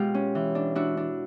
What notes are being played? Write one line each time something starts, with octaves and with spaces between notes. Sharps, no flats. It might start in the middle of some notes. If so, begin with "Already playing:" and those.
Already playing: B2 G#3 F4 G4
C#4
E3
D4
D4 E4 F#4
D4